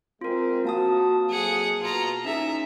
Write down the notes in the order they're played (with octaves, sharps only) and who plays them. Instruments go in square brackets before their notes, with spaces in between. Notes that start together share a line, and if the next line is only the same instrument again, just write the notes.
[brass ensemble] G#3 C4 [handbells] F4 A#4
[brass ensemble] F3 C4 F#4 [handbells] A#3 A5 D#6
[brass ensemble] F2 F#3 [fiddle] G#4 F#5
[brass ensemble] B2 [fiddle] F4 A#5
[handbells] C#4 D#4 G#4 [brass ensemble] E4 [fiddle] E5